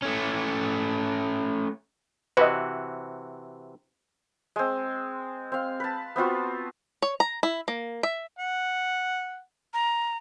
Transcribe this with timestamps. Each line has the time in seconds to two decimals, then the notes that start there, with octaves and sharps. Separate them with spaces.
0.02 A3 C#4
2.37 C3 E3 F#4 B4 D#5
4.56 G#3 C4
5.52 C4 F5
5.80 B4 A5
6.16 B3 C4 F4 F#4
7.02 C#5
7.20 A#5
7.43 E4
7.68 A#3
8.03 E5
8.39 F#5
9.74 A#5